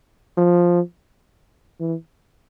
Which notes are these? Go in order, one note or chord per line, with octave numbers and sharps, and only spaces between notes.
F3
E3